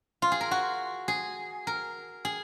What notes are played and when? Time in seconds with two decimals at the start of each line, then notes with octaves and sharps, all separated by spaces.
0.22 F4
0.32 G#4
0.41 A#4
0.51 F#4
1.08 G#4
1.67 A#4
2.25 G#4